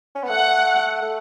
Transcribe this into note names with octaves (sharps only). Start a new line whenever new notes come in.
C#4
B3
A3 F#5
A3